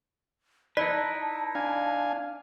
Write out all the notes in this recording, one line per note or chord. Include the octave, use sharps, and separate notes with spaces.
D#4 E4 B4 D5 A5
D4 F5 G#5